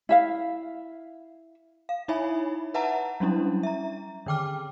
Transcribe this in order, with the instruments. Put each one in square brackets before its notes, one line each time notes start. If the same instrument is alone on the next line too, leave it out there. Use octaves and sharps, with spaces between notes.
[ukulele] E4 E5 F5
[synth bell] F5
D#4 E4 C#5 E5 G#5 B5
B4 E5 F#5 A5 A#5
F#3 G3 C#4 D4 E4
E5 A#5
D3 D#3 G5 D6 F6